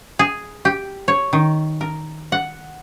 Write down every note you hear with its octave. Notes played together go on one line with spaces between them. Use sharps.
G#4
G4
C#5
D#3
A#4
F#5